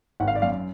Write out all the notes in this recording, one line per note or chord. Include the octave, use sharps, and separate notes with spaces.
G#1 F#5
F5
D5
F#2 F5